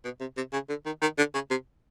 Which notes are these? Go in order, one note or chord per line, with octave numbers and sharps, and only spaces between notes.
B2
C3
C3
C#3
D3
D#3
D#3
D3
C#3
C3